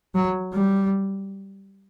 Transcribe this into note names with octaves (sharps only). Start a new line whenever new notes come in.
F#3
G3